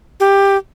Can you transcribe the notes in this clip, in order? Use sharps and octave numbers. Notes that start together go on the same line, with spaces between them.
G4